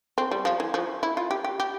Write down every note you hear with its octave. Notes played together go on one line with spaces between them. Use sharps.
C4
G3
F3
E3
F3
E4
F4
G4
G4
G4